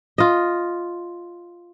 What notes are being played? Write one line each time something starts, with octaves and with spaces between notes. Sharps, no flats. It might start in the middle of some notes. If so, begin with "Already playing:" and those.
F4 D#5